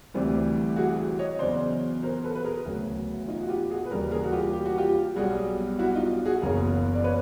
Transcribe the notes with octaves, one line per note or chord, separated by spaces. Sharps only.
D2 C3 E3 G3
F#4 G#4
C#5 D#5
E2 C#3 F#3 C5 D5
A#4 C5
A4 B4
B4
G#4 A#4
E1 D2 C#3 F#3
D#4 F4
F#4
F4 G4
F#4 G#4
B4
D#2 C#3 E3 G3 G#4 A#4
G#4 A#4
F#4
F4 G4
G4
F#4
F4 G4
B1 B2 G3 F#4 G#4
E4 F#4
D#4 F4
F#4 G#4
F#1 E2 C#3 G#4 A#4
D5
B4 C#5